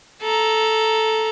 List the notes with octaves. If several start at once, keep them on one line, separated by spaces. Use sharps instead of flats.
A4 A#5